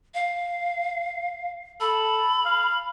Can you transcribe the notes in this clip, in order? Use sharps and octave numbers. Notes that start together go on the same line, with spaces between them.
F5
A4 B5
F5